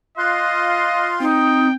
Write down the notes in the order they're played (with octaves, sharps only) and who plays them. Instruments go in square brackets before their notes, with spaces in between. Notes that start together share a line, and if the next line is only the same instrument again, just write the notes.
[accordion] F4 F5 C6 [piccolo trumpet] D#5 [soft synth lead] F#6
[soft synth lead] C4 [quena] D#4 [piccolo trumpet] G5